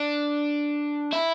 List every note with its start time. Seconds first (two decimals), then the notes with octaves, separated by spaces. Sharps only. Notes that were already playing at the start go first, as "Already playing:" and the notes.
Already playing: D4
1.12 E4